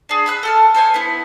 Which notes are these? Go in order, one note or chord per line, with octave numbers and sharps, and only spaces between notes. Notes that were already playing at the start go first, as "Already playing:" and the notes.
D4 G#4
B5 E6 F#6
A4 A5 F6
A4 C5 E5 G#5
B3 E4